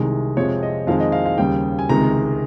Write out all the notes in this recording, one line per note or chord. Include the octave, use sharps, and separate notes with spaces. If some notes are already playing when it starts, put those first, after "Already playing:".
Already playing: C2 C3 D#3 G#3
F2 C3 F3 G#3 C#5
D#5
F2 D#3 G#3 F5
D#5
F5
F5
D#2 C#3 G3 G5
G#5
C#2 C3 D#3 G#3 A#5